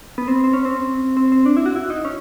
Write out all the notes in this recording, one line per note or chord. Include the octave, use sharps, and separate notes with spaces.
B3
C4
C4
C#4
C4
C4
C4
D4
E4
F#4
E4
D#4
C#4